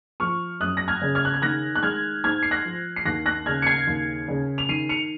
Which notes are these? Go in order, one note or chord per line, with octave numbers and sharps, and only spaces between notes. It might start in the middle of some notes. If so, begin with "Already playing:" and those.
F3 C#6 F6
F#2 D#6 F#6
A#6
F6 G#6
C#3
F6 G#6
F#6
G#6
D#3 F#6 A#6
F#6
G#3 F6 G#6
G#2 F6 G#6
C7
F#6 A#6
F3
C7
D#2 F#6 A#6
F#6 A#6
C#3 F6 G#6
C#7
G#6 C7
D#2
C#3
F7
D#3 C7 D#7
C#7 F7